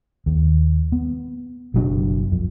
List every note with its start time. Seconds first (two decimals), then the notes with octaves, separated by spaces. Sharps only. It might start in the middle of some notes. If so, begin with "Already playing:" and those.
0.26 D#2
0.92 B3
1.74 F#1 B2 F#3 D4
2.32 F2